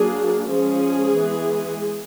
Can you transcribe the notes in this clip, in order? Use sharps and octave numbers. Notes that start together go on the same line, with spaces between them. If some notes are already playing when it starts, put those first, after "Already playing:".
Already playing: F#3 A#3 D4 G#4
F3 G#3 C#4 G#4
E3 G#3 B3